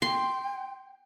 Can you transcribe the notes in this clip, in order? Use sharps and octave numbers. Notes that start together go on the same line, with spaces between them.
G5 C6